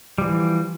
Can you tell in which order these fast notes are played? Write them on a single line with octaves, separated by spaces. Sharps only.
G3 F3 E3